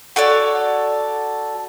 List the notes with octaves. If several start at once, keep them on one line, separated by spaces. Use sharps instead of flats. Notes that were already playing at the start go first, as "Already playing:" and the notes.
F#4 A4 C#5 D5